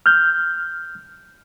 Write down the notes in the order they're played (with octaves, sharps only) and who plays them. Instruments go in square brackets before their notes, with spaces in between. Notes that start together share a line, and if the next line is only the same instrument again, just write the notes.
[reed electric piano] F6 G6